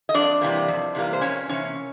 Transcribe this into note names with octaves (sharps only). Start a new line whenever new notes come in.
D#5
F2 D4 D5
C3 E3 G3 A#3
F2
C3 E3 G3 A#3
C5
F2 C#4 C#5
C3 E3 A#3 C#4 C#5